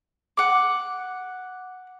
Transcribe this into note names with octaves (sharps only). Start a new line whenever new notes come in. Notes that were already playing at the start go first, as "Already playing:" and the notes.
F#5 D6